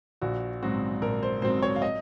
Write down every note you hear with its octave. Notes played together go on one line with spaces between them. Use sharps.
A#1 F#4
G#2 F#3 C4 F#4
A#1 A#4
C5
G#2 F#3 C4 C5
C#5
F5
D#5